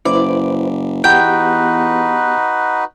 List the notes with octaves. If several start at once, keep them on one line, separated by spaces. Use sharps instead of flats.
F#1 E4 B4 C5 D5
E2 B3 D#4 F#4 G4 B4 F#5 G5